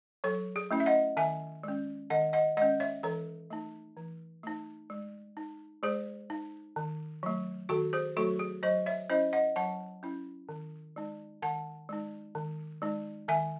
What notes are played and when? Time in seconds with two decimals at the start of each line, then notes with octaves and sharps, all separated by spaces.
0.24 F#3 A4 C#5
0.56 G#4
0.71 A3 C#4 E4
0.80 E5
0.86 D#5 F#5
1.17 D#3 E5 G#5
1.64 G#3 C#4
2.10 D#3 D#5 F#5
2.33 D#5 F#5
2.57 G#3 D#5 F#5
2.62 C#4
2.80 C#5 E5
3.03 E3 A4 C#5
3.50 A3 D#4
3.97 E3
4.43 A3 D#4
4.90 G#3
5.37 D#4
5.83 G#3 G#4 C5
6.30 D#4
6.76 D#3
7.23 F#3 A3
7.69 D#3 F#4 A4
7.93 G#4 C5
8.17 F#3 A3 F#4 A4
8.39 G#4
8.63 F#3 C5 D#5
8.86 C#5 E5
9.10 C#4 E4 C5 D#5
9.33 D#5 F#5
9.56 F#3 F#5 A5
10.03 C#4 E4
10.49 D#3
10.96 G#3 D#4
11.42 D#3 F#5 A5
11.89 G#3 D#4
12.35 D#3
12.82 G#3 D#4
13.28 D#3 E5 G#5